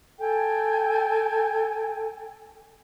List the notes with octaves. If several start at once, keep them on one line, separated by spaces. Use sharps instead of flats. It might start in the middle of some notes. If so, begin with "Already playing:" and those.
A4 G5 G#5